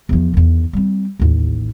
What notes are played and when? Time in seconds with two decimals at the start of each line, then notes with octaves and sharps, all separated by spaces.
0.09 E2 F3
0.34 E2 D#3
0.73 G3 C4
1.19 A1 D#2